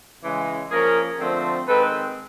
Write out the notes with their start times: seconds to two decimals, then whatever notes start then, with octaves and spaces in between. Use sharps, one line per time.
0.23 C#3 E3 G#3
0.71 F3 A#3 C#4 G#4 A#4
1.20 D3 F3 A3 C4
1.68 D#3 G#3 C4 A4 B4